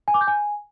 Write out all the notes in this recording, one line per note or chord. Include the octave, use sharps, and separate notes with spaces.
G#5
D6
G6
G#5